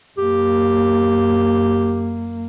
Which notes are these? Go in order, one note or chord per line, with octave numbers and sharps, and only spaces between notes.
F#2 A#3 G4